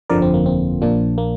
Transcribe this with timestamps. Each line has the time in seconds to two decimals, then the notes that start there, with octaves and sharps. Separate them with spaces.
0.10 G1 F2 D3 F3 A#4 D5
0.22 C4
0.34 A#3
0.46 C4
0.82 A#1 A#2 F3 A#3 D4
1.18 A#3